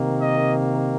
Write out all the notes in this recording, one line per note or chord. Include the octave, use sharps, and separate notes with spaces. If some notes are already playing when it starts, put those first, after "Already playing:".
Already playing: C3 D#3 A#3
D#5